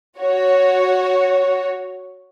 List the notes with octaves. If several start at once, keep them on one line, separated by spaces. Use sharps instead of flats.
F#4 C#5